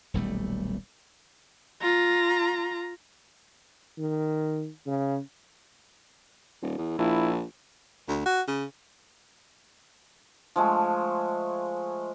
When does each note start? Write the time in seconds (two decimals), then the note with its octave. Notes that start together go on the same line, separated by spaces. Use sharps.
0.14 D#1 B1 G3 A3
1.82 F4 A#5
3.98 D#3
4.86 C#3
6.62 D#1
6.78 E2
6.98 A#1 E4
8.09 D2
8.26 F#4
8.48 C#3
10.56 F3 G#3 A3